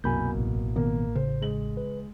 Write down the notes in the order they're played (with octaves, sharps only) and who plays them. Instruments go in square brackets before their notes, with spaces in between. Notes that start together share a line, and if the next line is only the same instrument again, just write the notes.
[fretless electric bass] C2 F#2 [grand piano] B2 A#3 [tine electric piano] G#5 B5 G6
[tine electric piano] A1 A2
[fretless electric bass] B2 D#3 B3 [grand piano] A#3
[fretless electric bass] C#3 [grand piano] C5
[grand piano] G#3 F#7
[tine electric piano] B4